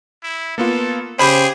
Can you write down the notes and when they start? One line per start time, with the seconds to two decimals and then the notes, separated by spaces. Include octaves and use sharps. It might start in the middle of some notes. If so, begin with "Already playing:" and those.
0.23 E4
0.58 A#3 B3 F4 A4
1.19 C#3 G4 G#4 C5 B5 E7